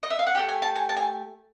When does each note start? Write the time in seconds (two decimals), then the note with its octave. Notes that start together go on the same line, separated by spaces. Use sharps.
0.03 D#5
0.10 E5
0.19 F5
0.27 F#5
0.35 A3 D4 G4 G5
0.49 G#5
0.62 A5
0.76 G#5
0.89 A5
0.97 G#5